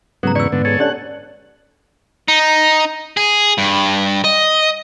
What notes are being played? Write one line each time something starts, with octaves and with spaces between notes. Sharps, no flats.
G#2 C#3 F#3 B3 A4 A#5
E2 D5 C#6 E6
G#2 D3 B3
G#4 A4 C#5
C#4 D4 G4 A4 D5 F#5
D#4
G#4
G2
D#5